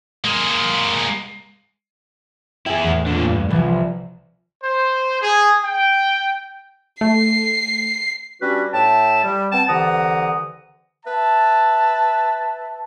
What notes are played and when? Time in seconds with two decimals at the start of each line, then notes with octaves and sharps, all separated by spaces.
0.24 G#3 A#3
2.66 E4 G#4 G5
2.83 E2 A2
3.06 A#2 D3
3.29 G2
3.51 C2 E3 F3
4.63 C5
5.21 G#4
5.63 G5
7.01 A3 C7
8.41 G3 C#4 D4 F#4 G4 B4
8.73 A2 E5 G5 A5
9.24 G3
9.52 B3 C4 G5 A5
9.68 C2 D3 E3 F#5 A#5 D#6
11.06 B4 E5 A5